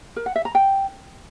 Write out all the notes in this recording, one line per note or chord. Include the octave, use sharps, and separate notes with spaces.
A#4
F#5
E5
A#5
G5